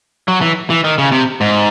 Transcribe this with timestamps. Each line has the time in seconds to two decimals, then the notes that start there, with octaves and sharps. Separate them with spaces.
0.28 F#3
0.41 E3
0.70 E3
0.84 D#3
0.98 C#3
1.12 C3
1.41 G#2